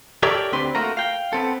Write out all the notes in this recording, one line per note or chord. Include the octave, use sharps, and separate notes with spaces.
G4 A4 A#4 C#5 D5 E5
D2 C4 D4 G4 B4 C6
A3 A#3 F4 F#4 A#4 A#5
F5 G5
B3 C4 A4